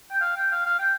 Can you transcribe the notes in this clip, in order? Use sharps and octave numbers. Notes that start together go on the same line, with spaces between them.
G5
F5
G5
F5
F5
G5